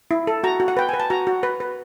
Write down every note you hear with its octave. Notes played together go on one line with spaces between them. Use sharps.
E4
A4
F#4 A#5
F#4
F#5
B4 G5
B4 G#5
A5
F#4 A#5
F#4
B4
B4